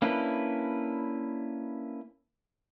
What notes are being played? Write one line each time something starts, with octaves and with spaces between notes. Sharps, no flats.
A#3 C#4 D4 E4 B4